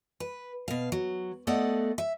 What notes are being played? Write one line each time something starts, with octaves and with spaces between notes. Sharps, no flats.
B4
B2 F5
F#3
A3 B3 A4 D5 D#5 F#5
E5